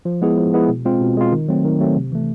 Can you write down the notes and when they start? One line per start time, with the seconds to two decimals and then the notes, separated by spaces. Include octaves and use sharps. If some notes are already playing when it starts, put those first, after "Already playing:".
0.05 F3
0.22 G#3 B3 E4 G#4
0.37 F3
0.54 G#3 B3 E4 G#4
0.69 B2
0.85 G#3 C4 F4
1.01 B2
1.17 G#3 C4 F4
1.32 D#3
1.48 F#3 A3 C4
1.65 D#3
1.80 F#3 A3 C4
1.96 C3
2.12 E3 A3